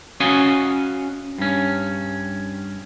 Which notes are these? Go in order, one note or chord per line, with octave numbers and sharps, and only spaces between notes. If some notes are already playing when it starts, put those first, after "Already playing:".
C#4 F#4 C#5 D#5 F5 G#5
G2 C#4